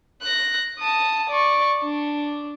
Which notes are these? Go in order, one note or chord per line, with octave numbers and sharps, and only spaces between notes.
F#6 A#6
A5 D#6
D5 C#6
D4